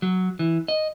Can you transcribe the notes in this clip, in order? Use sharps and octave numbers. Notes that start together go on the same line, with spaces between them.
F#3
E3
D#5